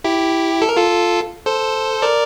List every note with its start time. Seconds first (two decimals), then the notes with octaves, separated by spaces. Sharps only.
0.04 E4 G4
0.62 A4
0.69 A#4
0.77 F4 A4
1.46 A4 C5
2.02 A#4 D5